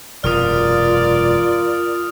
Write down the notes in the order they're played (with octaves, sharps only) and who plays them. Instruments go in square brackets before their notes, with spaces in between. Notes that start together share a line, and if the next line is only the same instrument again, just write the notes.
[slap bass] E1 F#2 C3 [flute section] F4 A#4 [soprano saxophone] D5 [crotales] D#6 F6